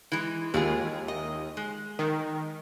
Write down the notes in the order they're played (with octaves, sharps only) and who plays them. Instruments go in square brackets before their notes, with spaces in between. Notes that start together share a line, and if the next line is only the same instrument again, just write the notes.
[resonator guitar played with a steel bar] E3 G#3
[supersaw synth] D#2 [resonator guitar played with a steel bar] G#3 F4 G#4
[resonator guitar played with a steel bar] D#5
G#3
[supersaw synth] D#3